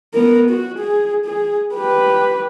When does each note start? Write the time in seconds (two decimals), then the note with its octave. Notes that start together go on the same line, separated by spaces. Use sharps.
0.14 B3 A#4
0.50 F#4
0.79 G#4
1.26 G#4
1.74 G4 B4